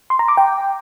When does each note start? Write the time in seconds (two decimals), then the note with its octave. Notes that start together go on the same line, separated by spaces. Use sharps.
0.10 C6
0.19 A#5
0.28 D6
0.37 G5